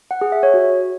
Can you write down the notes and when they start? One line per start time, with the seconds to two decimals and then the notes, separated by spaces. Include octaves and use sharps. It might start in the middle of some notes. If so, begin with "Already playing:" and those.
0.11 F#5
0.21 G#4
0.32 E5
0.43 C#5
0.54 F#4